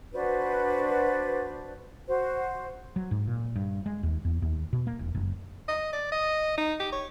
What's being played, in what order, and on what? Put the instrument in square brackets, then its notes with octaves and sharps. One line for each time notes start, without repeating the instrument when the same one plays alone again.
[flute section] D4 F#4 B4 C5
F#4 C5
[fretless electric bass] F#3
G#2
A#2
G2
G#3
D#2
E2
D#2
B2
A#3
E1
F#1
[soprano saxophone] D#5
D5
D#5
D#4
G4
C#5